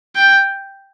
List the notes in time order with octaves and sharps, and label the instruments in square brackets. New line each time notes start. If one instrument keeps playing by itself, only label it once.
[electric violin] G5